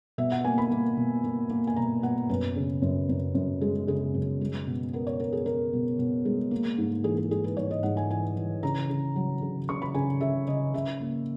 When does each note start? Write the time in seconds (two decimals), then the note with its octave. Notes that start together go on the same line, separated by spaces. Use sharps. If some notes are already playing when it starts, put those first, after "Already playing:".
0.18 B2 E5
0.32 F#5
0.44 A#3 G#5
0.58 B5
0.71 A#3
0.97 B2
1.24 A#3
1.50 A#3
1.67 G#5
1.76 B2 A#5
2.03 B2 F#5
2.29 F#2 B4
2.56 C#3
2.82 F#2
3.09 F#2
3.35 F#2
3.61 G#3
3.87 C#3 G#4
4.14 F#2
4.41 G#3
4.67 B2
4.93 B3 A#4
5.07 C#5
5.20 B3 A#4
5.33 G#4
5.46 B3 A#4
5.73 B2
5.99 B2
6.25 G#3
6.51 A#3
6.78 G#2
7.04 E3 G#4
7.18 G#4
7.31 G#2 G#4
7.44 B4
7.57 G#2 C#5
7.71 D#5
7.83 G#2 F#5
7.97 G#5
8.10 E3 G#5
8.37 E3
8.63 C#3 A#5
8.89 C#3
9.16 F#3
9.42 C#3
9.69 C#3 C#6
9.82 B5
9.94 C#3 G#5
10.21 C#3 E5
10.48 C#3 D#5
10.74 C#3 E5
11.01 A#3